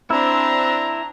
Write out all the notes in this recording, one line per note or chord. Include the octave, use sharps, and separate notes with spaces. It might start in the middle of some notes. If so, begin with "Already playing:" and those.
C4 D4 E4 A#5